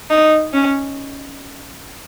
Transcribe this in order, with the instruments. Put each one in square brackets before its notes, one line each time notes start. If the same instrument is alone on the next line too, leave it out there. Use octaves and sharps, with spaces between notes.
[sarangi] D#4
C#4